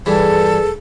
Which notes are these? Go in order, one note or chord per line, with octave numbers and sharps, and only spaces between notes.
G2 E3 G#4 A4 B4